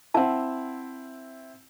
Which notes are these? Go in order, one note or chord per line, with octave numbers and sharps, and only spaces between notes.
C4 E4 F#5 A5